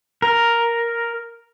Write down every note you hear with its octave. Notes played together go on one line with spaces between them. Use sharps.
A#4